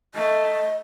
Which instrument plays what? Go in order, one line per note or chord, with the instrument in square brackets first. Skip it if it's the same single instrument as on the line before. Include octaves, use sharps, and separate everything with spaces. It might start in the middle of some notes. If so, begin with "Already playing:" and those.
[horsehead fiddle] A3 [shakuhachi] D#5